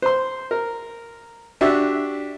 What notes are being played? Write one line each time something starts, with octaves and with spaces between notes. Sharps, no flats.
C5 C6
A#4
D4 F#4 G4 E5